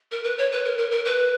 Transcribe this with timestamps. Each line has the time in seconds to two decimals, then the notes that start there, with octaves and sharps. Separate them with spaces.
0.11 A#4
0.24 B4
0.38 C#5
0.52 B4
0.65 A#4
0.78 A#4
0.91 A#4
1.05 B4